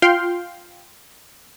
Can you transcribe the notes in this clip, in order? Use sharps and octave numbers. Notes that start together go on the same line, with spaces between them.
F4 F5 G5 C6